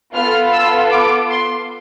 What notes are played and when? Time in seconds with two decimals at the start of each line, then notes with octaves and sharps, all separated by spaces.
0.14 B3 F4 A4 F6
0.52 E6
0.90 D6
1.30 C6